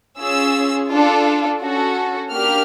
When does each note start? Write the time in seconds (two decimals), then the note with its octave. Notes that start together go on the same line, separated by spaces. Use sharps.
0.19 C#4 F4 G#4 E6
0.90 D4 F4 A4
1.61 C#4 F#4 A4
2.31 A#3 D4 G4 F6